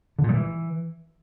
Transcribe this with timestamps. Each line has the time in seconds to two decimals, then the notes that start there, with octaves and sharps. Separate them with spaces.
0.19 D3
0.24 A#2
0.29 G3
0.34 E3